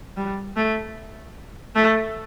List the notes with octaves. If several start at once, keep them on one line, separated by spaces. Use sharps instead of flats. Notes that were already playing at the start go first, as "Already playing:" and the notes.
G3
A3
A3